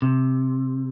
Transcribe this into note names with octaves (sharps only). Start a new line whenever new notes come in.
C3